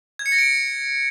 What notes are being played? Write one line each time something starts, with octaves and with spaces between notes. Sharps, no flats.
G#6
C#7
A#6
D7